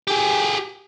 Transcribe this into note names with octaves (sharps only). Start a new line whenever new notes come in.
G4 G#4